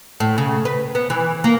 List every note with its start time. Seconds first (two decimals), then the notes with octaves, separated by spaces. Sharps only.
0.20 A2
0.38 C#3
0.65 B4
0.95 B3
1.10 E3
1.44 A#3